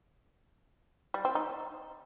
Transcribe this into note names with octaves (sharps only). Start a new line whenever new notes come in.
G3
C4
D#4